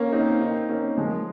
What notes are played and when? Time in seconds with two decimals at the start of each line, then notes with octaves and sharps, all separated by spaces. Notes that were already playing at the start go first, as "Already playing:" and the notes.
Already playing: A#3 C#4
0.12 C4 D#4
0.41 C4 D#4
0.69 A#3 C#4
0.97 F3 G#3